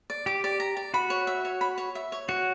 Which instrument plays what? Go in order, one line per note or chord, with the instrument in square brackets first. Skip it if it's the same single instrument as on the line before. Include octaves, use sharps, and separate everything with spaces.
[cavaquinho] D5
[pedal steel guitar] G4 [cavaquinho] D6
[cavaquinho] D5
A#5
D5
[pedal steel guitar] F#4 [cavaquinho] B5
[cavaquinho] C#5
E5
C#5
B5
C#5
E5
C#5
[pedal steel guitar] F#4 [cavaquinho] C#5